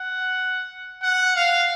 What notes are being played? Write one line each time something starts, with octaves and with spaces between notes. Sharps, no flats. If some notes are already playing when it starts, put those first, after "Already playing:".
Already playing: F#5
F#5
F5